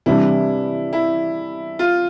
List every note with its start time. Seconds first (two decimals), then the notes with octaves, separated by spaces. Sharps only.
0.06 C3 E3 G3 D4 E4
0.93 E4
1.79 F4